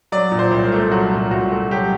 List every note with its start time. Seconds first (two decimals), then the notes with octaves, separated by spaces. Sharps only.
0.12 F#3 D5
0.32 A#2
0.39 C5
0.51 C2
0.65 A#4
0.72 A3
0.91 F#3 F#4
1.11 A#2
1.30 C2 F#4
1.51 A3
1.71 F#3 G4